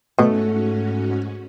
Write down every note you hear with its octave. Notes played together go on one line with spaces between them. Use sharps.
G#2 B2 A3 C#4 F#4